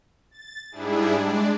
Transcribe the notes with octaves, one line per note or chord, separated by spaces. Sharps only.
A6
G#2 G3 D4 E4 G#4
G#3 D4 D5